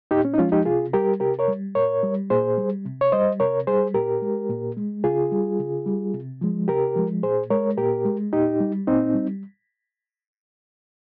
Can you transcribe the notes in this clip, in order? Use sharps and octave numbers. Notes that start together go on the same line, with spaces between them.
A#2 D#4 G4
C#4
D#4
F3 G#3 C#4 F4
D#4 G4
C3 F4 G#4
G3 G4 A#4
C3 G4 A#4
A#4 C#5
G3
A#2 A#4 C#5
G3
A#2 G#4 C5
G3
C3
C#5
G3 C5 D#5
C3 A#4 C#5
G3 G#4 C5
A#2 G4 A#4
G#3
A#2
G#3
C#3 F4 G#4
G3
C#3
G3
C3
F3 G#3
C3 G4 A#4
F3 G#3
A#2 G#4 C5
G#3 A#4 C#5
A#2 G4 A#4
G#3
A#2 D#4 G4
G3
A#2 C4 D#4
G3